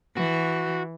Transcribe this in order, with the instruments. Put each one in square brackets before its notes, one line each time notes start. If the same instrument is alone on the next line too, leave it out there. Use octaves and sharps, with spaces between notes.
[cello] E3 [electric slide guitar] F#4